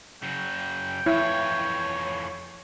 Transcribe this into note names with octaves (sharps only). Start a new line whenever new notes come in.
C#3 F#3 G5
F2 E3 E4 C#5